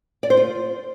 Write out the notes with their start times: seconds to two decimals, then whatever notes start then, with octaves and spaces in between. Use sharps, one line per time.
0.23 D5
0.30 C5
0.37 F4